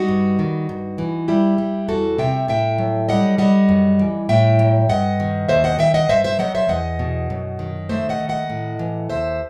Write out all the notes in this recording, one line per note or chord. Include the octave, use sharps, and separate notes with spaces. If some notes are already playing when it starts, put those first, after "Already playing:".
Already playing: G3 D#4 F#4
G2
D#3
G2
E3
G3 E4 G4
G3
E2 F#4 A4
C3 E5 G5
A2 E5 G5
F#3
G3 D#5 F#5
G3 D#5 F#5
F#2
E3
A2 E5 G5
F#3
G2 D#5 F#5
D#3
D#2 C5 E5
D#5 F#5
D#3 E5 G5
D#5 F#5
G2 C5 E5
C5 E5
F#3 D#5 F#5
C5 E5
E2 D#5 F#5
B2
F#2
D#3
A3 C5 E5
D#5 F#5
D#3
D#5 F#5
A2
E3
D#2 C5 E5